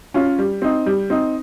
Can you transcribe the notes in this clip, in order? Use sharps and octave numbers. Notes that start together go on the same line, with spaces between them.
C#4 F4
G3
C4 D#4
G3
C4 D#4